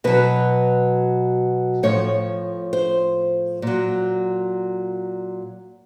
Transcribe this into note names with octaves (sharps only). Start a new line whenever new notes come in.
B2 F#3 B4
A2 F3 C#5
C5
A#2 F#3